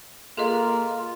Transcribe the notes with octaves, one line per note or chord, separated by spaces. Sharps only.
A#3 F4 G#4 A4 D#5